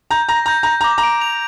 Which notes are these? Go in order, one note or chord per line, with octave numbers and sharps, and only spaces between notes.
A#5 G6
A#5 A#6
A#5 G6
A#5 G6
A#5 D6
A#5
D7
F7